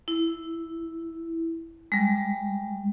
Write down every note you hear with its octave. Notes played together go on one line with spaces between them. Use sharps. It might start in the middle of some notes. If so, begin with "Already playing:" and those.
E4
G3 G#3